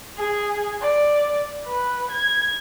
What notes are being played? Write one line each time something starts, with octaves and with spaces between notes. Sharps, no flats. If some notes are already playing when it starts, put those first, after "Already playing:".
G#4
D5
B4
G#6